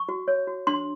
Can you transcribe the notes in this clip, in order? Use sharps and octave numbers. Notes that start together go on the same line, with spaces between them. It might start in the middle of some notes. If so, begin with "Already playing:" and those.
Already playing: C#6
F#4
C#5
F#4
D4 C6